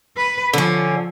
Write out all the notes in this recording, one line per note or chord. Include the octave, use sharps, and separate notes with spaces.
B4
D3 F3 C#4